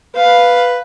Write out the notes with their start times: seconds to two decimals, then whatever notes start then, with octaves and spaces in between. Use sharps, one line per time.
0.15 B4 F5